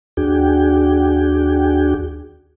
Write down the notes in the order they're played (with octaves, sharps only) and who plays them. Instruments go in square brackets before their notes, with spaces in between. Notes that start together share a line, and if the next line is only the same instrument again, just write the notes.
[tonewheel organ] D#2 D4 F#4 G#4 G5